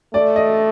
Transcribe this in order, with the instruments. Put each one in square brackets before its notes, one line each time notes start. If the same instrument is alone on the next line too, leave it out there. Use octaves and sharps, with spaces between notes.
[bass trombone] A3 [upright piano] D5
[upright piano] D#5